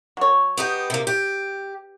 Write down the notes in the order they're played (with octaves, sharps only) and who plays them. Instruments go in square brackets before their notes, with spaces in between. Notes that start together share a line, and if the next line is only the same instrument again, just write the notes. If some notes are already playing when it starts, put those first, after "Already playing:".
[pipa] F#3 C#5
[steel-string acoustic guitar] B3 D#4 G4
C3 A#3
G4